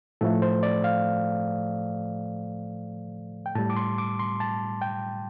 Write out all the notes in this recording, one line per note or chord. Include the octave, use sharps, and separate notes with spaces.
A2 F3 A3 A4
C5
D5
F5
G5
A2 G3 A5
D6
C6
D6
C6
A5
G5